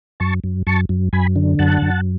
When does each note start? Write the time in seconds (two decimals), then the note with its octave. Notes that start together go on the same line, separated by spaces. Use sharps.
0.20 F#2 A5 C#6
0.44 F#2
0.67 F#2 A5 C#6
0.89 F#2
1.13 F#2 G#5 B5
1.36 D3
1.59 F#2 F#5 A5
1.82 F#2